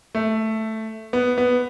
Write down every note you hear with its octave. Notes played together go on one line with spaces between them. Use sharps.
A3
B3
B3